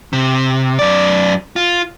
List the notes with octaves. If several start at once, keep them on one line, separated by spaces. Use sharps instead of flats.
C3
F#2 D5
F4